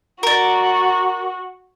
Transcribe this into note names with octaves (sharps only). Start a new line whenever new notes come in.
F#4 A#4 D5